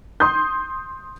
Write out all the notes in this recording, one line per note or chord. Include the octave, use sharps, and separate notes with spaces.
C6 D#6 G6